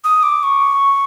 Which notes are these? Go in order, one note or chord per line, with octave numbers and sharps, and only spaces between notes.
D#6
D6
C#6